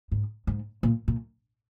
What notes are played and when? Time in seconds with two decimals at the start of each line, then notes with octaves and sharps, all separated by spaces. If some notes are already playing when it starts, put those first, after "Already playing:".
0.12 G#2
0.47 G#2
0.83 A#2
1.08 A#2